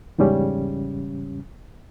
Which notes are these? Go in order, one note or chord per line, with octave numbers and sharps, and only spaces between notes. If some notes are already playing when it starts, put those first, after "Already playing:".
E2 G#2 C#3 G3 C#4